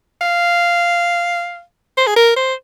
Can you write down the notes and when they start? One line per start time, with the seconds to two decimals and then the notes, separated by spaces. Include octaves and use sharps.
0.21 F5
1.98 C5
2.07 G#4
2.16 A#4
2.36 C5